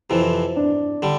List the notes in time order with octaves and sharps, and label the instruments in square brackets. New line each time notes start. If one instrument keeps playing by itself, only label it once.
[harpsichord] F2 C3 E3 [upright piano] E4
[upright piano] D4
[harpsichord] D3 G3